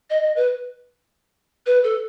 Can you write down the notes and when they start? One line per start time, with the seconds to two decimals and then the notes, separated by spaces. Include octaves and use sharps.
0.10 D#5
0.23 D#5
0.36 B4
1.66 B4
1.84 A4